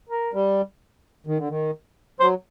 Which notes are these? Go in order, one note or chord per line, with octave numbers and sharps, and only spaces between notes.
A#4
G3
D#3
D3
D#3
F#3 C5